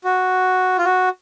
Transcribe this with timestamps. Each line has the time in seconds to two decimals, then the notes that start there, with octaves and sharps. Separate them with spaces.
0.04 F#4
0.78 F4
0.85 F#4